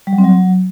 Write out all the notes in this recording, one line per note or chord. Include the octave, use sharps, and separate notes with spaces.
G3
F#3
C4
F#3